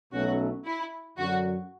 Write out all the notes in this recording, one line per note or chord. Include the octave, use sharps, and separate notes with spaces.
B1 B2 F#3 A3 C#4 F#4
E4
F#2 D3 F#3 F#4